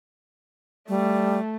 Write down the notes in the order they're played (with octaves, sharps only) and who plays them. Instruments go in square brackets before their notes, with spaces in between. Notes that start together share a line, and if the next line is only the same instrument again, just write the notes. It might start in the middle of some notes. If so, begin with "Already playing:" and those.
[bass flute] G3 [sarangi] A3